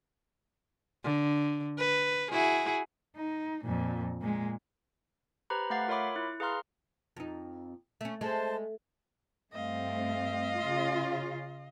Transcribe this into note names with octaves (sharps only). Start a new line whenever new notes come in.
D3
B4
E4 F#4 G#4
D#4
F2 A#2
A#2 G#3
G4 B4 C5 A#5 B5
A3 F5 F#5 A6 C7
F4 A#4 C#5 E5 B5 D6
E4
G#4 B4 F5 A#5 C6 F6
F2 D#4
A3 C#4
G#3 A3 C5 A5
G2 A3 C4 D#5 F5
C#3 F4